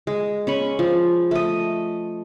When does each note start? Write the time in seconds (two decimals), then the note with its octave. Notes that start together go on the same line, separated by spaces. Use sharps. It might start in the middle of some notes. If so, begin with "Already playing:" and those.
0.07 G#3
0.47 C#4 B5 C#6
0.79 F3
1.31 A3 D#5